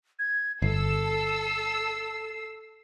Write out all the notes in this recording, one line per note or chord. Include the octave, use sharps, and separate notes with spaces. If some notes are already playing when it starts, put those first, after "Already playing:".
G#6
G1 A4 E6 C7